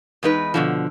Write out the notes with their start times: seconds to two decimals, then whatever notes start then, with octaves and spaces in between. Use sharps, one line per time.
0.23 E2 G#3 D#4 B4
0.54 B2 D3 F3